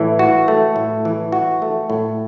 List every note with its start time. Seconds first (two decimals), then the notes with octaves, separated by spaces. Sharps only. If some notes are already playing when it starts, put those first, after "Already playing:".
Already playing: A2 E3
0.19 F#4
0.48 A3
0.76 A2
1.05 E3
1.32 F#4
1.62 A3
1.90 A2